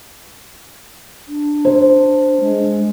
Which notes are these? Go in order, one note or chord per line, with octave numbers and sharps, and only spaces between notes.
D4
C5
G#3